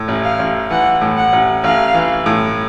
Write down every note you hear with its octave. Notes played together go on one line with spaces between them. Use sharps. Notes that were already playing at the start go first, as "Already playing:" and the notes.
Already playing: A2
A1
F5
A1
E3 F#5
A2
F#5
A1
A1 F5
E3
A2